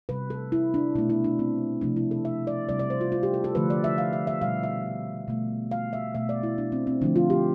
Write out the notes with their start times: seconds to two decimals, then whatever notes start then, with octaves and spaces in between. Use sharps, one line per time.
0.09 C3 G3 B4
0.30 A4
0.52 E4
0.74 D4
0.95 B2 A3 E4
1.10 E4
1.24 D4
1.39 C4
1.81 C3 F3 A3 D4
1.96 E4
2.11 A4
2.25 E5
2.47 D5
2.69 C3 G3 D5
2.79 D5
2.90 C5
3.01 F4
3.12 F4
3.23 G4
3.34 A4
3.44 A4
3.55 D3 F3 A3 B4
3.70 D5
3.84 E5
3.98 F5
4.13 E5
4.27 E5
4.41 B2 G3 F5
4.63 E5
5.28 B2 A3
5.71 F5
5.93 E5
6.15 B2 A3 E5
6.29 D5
6.43 E4
6.58 D4
6.72 C4
6.87 C4
7.01 D3 F3 A3 D4
7.16 F4
7.30 G4